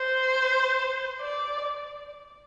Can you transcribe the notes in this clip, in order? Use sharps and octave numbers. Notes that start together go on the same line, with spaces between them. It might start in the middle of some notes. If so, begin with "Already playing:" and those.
Already playing: C5
D5